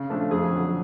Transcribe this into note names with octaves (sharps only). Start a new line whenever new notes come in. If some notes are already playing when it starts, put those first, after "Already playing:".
Already playing: C#3
F3 A3 D4 F4
F2 G#4
D3 F#3